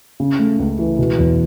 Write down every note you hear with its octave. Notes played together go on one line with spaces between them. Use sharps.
C#3
A3
C#2
E3
B2
E2